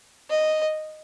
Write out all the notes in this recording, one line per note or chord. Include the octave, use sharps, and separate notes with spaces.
D#5